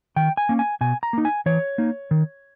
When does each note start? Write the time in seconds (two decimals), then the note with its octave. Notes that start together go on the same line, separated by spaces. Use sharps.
0.16 D#3 G5
0.37 G#5
0.49 A#3 C#4
0.59 G#5
0.81 B2 G#5
1.03 A#5
1.13 A#3 D#4
1.25 G#5
1.46 E3 C#5
1.78 A#3 D#4
2.11 D#3